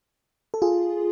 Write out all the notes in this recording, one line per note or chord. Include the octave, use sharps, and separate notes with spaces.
A4
F4 G#4